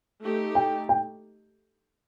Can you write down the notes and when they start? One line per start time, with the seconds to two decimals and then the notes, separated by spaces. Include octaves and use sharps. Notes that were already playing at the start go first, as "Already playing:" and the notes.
0.22 A3 D#4 G4
0.55 G5
0.89 G5